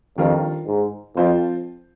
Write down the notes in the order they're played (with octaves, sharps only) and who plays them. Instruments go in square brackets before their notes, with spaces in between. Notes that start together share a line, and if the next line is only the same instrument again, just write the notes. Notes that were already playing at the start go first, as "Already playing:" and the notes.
[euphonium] F2 [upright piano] D#3 G3 D4 F4 A#4
[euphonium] G#2
[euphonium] F2 [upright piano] F3 C4 F4 C5